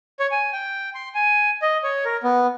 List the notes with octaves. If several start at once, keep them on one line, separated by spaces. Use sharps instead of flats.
C#5
G#5
G5
C6
G#5
D#5
C#5
A#4
B3